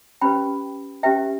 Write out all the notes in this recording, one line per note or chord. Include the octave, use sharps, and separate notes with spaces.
C#4 G4 B4 G5 B5
C#4 G4 B4 E5 G5